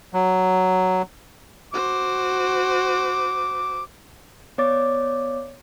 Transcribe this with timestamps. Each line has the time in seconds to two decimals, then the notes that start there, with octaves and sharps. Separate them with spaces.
0.14 F#3
1.73 F#4 C5 D6
4.58 B3 C#5 D5 D6 A6